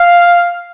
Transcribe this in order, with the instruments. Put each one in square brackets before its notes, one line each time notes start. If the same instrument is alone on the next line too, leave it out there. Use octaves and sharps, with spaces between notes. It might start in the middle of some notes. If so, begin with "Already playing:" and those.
Already playing: [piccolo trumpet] F5